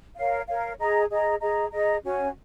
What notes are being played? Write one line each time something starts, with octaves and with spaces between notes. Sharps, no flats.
A#4 C#5 F5
A#4 C#5 F5
G#4 D#5 A#5
G#4 D#5 A#5
G#4 D#5 A#5
G#4 D#5 A#5
C#4 F#4 C#5 G#5